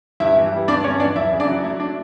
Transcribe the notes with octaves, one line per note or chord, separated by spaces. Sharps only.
G2 E4 E5
E3
G3
G2 D4 D5
G2 C#4 C#5
E3 D4 D5
F#2 E4 E5
C#3
D4 D5
F#3
A3 E4
D4